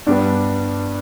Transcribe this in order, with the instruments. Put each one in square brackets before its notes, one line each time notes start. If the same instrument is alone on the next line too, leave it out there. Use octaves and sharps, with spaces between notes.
[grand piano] G2 G3 B3 D4